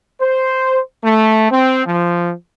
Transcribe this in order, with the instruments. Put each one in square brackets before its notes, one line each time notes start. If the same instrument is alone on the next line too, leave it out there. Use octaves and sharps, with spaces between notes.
[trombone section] C5
A3
C4
F3